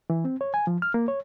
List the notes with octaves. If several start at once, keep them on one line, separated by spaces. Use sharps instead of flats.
E3
C4
C#5
G#5
F3
F6
A#3
C#5